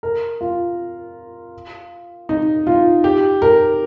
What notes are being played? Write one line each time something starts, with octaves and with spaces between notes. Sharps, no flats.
A#4
F4
D#4
F4
G4
A#4